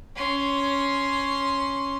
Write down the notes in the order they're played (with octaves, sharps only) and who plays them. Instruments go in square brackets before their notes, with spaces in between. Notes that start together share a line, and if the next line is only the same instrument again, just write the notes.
[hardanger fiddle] C#4 C6